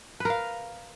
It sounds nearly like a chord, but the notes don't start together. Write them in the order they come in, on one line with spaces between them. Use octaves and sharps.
B4 A#4 F5